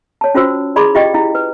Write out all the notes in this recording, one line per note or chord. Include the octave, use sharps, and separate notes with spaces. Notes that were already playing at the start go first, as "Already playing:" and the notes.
C#5 A5
C#4 F4 F#4 C5 E6
E4 G#4 D5 B5 C6 D6
F4 G4 D5 D#5 G5
E4 F5
B4